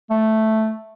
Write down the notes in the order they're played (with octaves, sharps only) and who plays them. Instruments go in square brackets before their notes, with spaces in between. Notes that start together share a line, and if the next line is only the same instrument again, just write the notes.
[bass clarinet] A3